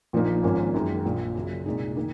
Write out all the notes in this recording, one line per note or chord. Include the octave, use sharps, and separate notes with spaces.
A#1 A#2 F3 A#3 D#4
G#1 G#2 F3 A#3 C#4
F#2 D#3 G#3
A#1 A#2 F3
F#2 C#3 F#3
C2 A#2 G#3 D#4
D#3 A#3 D#4